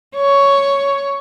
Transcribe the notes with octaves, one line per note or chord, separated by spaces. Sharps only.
C#5